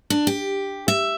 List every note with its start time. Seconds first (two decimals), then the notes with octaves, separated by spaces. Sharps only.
0.10 D4
0.27 G4
0.88 E5